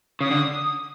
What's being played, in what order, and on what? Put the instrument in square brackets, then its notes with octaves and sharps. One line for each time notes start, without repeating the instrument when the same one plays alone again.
[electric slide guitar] C#3 [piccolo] D#6
[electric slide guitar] D3